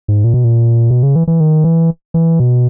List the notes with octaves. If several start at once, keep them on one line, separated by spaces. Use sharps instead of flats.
G#2
A#2
B2
A#2
B2
C#3
E3
E3
D#3
E3
E3
B2